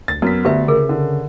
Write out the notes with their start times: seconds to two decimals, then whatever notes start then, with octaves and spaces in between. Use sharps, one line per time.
0.08 D2 A6
0.22 F#2 B3 B6
0.45 D2 G4 B4 E5
0.68 C#3 G#4 A#4
0.89 D3